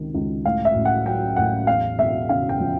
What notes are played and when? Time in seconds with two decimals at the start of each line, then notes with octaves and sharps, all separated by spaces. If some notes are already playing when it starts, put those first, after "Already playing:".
Already playing: C#2 C3 D#3
0.14 C#2
0.45 A2 F5
0.65 E5
0.75 A1
0.85 F#5
1.06 F#3 G5
1.36 A1 F#5
1.67 E2 F5
1.99 E1 E5
2.29 C#3 F5
2.49 G5
2.60 F3